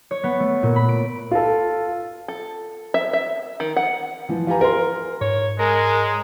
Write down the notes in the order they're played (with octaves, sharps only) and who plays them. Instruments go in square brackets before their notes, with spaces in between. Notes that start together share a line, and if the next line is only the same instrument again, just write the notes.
[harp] C#5
B3
A3
A#2
B5
D7
[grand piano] F4 A4
[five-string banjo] A4
E5
E5
D#3
F#5
[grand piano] E3 F3
F4 G4 B4 G#5 A#5
A#4 C6
[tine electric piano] G#2 [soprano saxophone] C#5
[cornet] G#3 [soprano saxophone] A#4